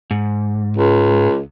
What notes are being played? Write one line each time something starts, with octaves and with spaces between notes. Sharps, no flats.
G#2
C#2